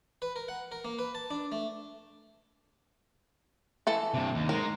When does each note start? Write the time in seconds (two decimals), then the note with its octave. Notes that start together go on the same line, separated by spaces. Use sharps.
0.22 B4
0.36 A#4
0.48 F#5
0.72 A#4
0.85 A#3
0.99 B4
1.15 A5
1.31 D4
1.52 A3
3.87 E3 A4 A5
4.14 G2 C3
4.34 D#2
4.49 G#3 D#4 A#4